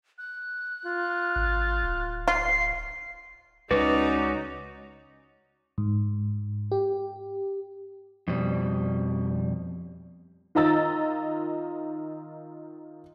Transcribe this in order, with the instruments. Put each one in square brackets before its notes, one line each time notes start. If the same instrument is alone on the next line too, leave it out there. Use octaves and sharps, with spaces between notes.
[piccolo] F#6
[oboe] F4
[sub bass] G#1
D1
[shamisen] F4 [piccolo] C7
[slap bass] C#2 [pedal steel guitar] C#4 F#4 D5 [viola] D#4 [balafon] B4
[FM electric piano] G#2
G4
[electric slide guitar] F2 B2 G3
[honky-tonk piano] D#3 F4 D#5 A#5 E6 A6